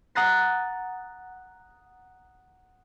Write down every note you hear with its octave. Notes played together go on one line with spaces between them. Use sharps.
F#5 A#5 D#6 F#6 A6 C7